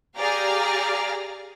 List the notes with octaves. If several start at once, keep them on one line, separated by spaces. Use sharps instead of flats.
G4 G#4 D5 F5 A#5 F6